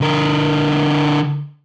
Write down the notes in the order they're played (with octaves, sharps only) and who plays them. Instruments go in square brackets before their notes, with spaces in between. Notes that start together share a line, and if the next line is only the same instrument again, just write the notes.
[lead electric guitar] D3 A#4